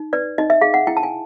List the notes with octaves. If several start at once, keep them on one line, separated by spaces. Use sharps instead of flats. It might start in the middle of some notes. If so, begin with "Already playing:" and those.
Already playing: D#4
B4 D5
D#4 D#5
E5
G#4 F5
F#5
E4 G5
A5
G#5